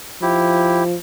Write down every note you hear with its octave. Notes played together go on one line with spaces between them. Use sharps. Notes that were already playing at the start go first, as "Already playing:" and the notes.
F3 E4 G4